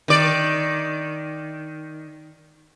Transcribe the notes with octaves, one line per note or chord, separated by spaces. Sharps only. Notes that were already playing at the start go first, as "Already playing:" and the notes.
D#3 D5